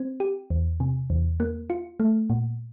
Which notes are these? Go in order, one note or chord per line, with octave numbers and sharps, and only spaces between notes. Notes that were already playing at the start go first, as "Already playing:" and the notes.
Already playing: C4
G4
E2
C3
E2
A#3
F4
A3
A#2